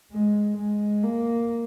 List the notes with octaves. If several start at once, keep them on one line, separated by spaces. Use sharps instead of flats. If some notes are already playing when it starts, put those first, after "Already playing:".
G#3
G#3
A#3